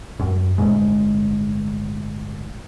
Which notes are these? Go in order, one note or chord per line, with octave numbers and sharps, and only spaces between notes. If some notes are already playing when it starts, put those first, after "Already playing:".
F#2
G1 F2 A2 G#3